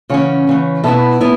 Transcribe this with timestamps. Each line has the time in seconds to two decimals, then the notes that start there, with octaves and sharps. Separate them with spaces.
0.10 C#3 E3 C#4 C#5 F#5
0.47 C#3 E3 C#4
0.84 B2 B3 E4 E5 A5
1.21 B3 E4